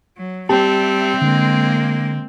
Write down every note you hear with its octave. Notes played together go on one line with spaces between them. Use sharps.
F#3
G3 C4 G4 E5 A5
D3 G#3 A#3